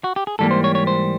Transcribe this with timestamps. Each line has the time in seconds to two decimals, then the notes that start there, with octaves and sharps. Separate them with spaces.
0.04 F#4
0.16 G4
0.27 G#4
0.39 G#2 E3 G3 A#3 A4
0.51 C5
0.64 C#5
0.75 C#5
0.87 C5